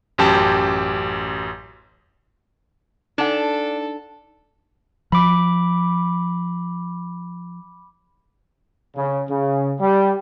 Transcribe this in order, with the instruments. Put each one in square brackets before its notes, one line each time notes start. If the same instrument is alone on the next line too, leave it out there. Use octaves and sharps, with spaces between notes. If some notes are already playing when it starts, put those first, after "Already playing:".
[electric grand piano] A1 F#2 G4 A5
[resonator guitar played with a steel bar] D4 [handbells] D#4 F#5 [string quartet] A4
[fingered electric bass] F3 [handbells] B5 D6
[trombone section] C#3
C#3
G3